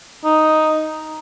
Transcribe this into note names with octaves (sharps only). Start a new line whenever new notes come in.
D#4